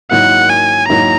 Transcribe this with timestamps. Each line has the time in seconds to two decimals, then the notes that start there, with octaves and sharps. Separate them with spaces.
0.11 G#2 D#3 F#3 A#3 E4 F#5
0.50 G#5
0.89 G#2 D#3 F#3 A#3 E4 A#5